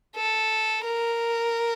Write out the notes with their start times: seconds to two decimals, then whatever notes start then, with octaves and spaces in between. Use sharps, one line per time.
0.16 A4
0.84 A#4